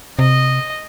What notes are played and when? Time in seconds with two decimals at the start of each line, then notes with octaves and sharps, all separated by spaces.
0.19 C3 D#5